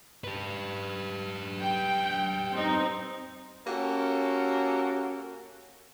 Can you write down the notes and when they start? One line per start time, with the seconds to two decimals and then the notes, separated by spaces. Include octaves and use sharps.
0.24 G4 B4
1.61 G5
2.54 C4 D#4
3.67 A#3 C#4 F#4 G4 A4 A#4